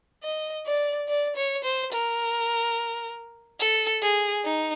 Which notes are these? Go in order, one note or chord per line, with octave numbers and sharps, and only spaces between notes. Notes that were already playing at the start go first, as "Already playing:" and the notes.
D#5
D5
D5
C#5
C5
A#4
A4
G#4
D#4